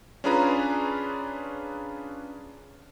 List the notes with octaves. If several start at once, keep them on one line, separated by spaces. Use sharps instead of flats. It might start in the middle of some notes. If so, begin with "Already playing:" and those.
C#4 D4 F4 G#4 B4 A#5